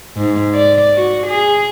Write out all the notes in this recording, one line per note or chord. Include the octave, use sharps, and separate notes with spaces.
G#2
D5
F#4
G#4